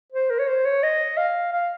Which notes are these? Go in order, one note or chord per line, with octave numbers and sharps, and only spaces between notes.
C5
A#4
C#5
C5
C#5
D#5
F5
F5